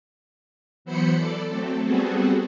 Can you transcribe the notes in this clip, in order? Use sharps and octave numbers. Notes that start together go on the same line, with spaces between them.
E3 F#3 B3 C5 B5 C#7
A4 D5
F#3 A3 C4 A4
G3 B3 C4 F#4 G#4 A4